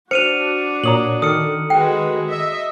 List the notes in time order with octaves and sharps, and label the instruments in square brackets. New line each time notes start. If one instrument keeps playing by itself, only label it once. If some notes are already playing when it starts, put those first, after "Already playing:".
[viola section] D4 F#4 [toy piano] C5 [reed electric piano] F6 [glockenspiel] C#7 D#7 F7
[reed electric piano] A#2 C#5 [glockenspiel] A#5 D#6 F#7
[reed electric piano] D#3 A4 F6 [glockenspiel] D#6 C#7
[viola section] G#3 F#4 B4 [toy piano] G5
[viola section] D#5 E5